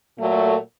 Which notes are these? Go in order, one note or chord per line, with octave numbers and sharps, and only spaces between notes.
A#2 F#3 A3